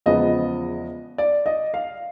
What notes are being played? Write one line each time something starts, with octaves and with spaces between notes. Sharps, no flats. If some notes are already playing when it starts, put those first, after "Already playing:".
E2 C#3 F3 G#3 B3 D#5
D5
D#5
F5